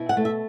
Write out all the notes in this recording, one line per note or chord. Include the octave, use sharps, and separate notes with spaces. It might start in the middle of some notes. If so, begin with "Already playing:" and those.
Already playing: B2 E4
F#5
A3
E5